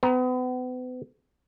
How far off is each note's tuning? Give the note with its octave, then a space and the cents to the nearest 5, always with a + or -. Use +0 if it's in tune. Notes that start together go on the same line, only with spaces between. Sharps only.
B3 +40 A#5 +25